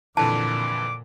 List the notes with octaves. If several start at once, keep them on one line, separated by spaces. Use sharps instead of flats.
F2 A#2 D3 E3 A5 D6